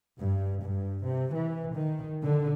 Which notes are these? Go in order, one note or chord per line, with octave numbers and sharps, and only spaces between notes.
G2
G2
C3
E3
D#3
D3